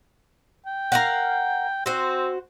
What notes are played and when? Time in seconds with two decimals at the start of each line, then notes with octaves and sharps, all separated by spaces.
0.66 G5
0.92 A#4 F5 F#5
1.86 C4 F#4 C5